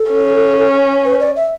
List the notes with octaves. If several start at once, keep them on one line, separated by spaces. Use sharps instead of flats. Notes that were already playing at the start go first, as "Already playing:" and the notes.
Already playing: A4
C#4
B4
D5
E5